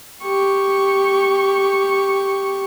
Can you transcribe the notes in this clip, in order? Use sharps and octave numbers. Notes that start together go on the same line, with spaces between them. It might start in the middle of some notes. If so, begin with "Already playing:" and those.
G4 C#6